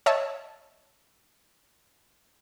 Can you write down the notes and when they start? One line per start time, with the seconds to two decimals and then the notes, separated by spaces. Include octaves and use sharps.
0.06 C#5 D#5 E5 A5